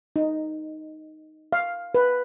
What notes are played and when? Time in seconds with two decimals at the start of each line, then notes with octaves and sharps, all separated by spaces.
0.16 D#4
1.53 F5
1.95 B4